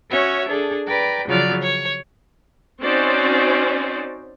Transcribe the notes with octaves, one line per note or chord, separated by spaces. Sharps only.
C#4 F#4 C#5 E5
D4 G#4 A4
B4 D5 G5 A#5
C#3 F3 F#3 F4 D5 F6
C#5
C4 C#4 D#4 F#4 C5 D5